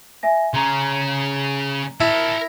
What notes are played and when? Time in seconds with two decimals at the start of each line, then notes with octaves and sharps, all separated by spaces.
0.23 E5 G#5 A#6
0.54 C#3 C#4 A#5 C6
2.00 E4 A#4 A5